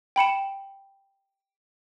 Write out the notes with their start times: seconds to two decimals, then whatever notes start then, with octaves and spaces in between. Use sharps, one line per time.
0.16 G5 B5 C#7 E7